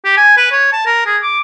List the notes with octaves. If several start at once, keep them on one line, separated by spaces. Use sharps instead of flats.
G4
G#5
B4
C#5
A5
A#4
G#4
D6